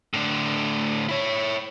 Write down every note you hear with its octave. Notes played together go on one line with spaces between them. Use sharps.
A2 D3
E4 C#5